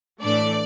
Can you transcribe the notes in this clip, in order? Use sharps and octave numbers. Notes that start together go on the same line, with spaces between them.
A2 E3 A3 D4 D5